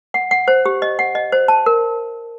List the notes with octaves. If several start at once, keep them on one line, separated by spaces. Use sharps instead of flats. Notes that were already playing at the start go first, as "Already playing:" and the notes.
F#5
F#5
C5
G4
D#5
F#5
D#5
C5
A5
A#4